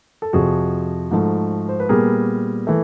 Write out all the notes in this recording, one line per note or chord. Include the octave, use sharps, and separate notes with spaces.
A4
F2 C3 F3 F#4 G#4
G#2 F3 A3
C5
B4
A#2 G3 B3 G#4 A#4
E3 A3